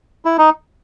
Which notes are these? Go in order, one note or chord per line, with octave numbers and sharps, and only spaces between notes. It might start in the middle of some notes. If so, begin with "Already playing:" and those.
E4
D#4